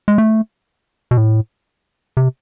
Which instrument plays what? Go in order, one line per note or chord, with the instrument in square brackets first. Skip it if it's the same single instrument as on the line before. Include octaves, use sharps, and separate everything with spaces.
[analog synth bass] G#3
A3
B2
A2
C3